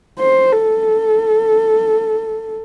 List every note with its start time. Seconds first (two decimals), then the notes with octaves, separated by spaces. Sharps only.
0.19 C5
0.52 A4